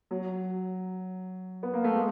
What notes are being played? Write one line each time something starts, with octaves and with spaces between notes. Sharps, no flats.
F#3
B3
A#3
A3
G#3